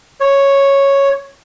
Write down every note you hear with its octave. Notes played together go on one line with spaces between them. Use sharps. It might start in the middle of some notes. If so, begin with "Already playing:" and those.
C#5